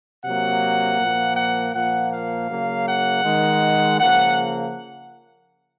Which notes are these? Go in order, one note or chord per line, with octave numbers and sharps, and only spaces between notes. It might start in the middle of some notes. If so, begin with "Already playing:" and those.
C3 F#3 A#3 F#5
A#2 F3 A#3
F#5
A#2 F3 A#3 F#5
F5
C#3 F#3 A#3
F#5
D#3 G#3
C#3 F3 A#3 F#5